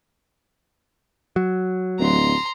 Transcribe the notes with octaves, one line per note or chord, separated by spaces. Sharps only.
F#3
D1 A#5 C6